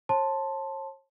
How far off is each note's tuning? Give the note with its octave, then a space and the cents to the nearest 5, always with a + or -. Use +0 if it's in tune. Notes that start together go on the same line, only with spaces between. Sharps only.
C#5 -40 A5 +0 C6 +0